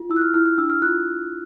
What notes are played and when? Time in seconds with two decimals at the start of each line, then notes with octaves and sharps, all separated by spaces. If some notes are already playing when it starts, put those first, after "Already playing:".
Already playing: F4
0.10 E4 E6
0.16 F#6
0.22 F6
0.34 E4 F6
0.46 F6
0.58 D4 E6
0.70 F6
0.82 F4 F#6